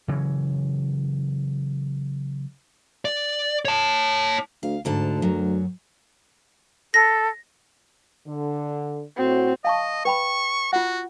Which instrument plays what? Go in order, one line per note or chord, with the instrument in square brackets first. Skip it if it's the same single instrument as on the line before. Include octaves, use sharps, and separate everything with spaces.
[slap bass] C#3 E3 F#3
[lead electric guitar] D5
C#5 A5
[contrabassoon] D2 [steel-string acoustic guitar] F5
[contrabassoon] D2 [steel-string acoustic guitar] G#2 D3 A5
[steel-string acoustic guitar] F#2 F#3
[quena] A4 [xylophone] A#6
[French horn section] D3
[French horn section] A2 F#4 [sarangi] C4
[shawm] D#5 [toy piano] F5 A5 C#6
[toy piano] B4 G5 B5 [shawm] C#6
[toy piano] F4 F#5 [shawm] F#4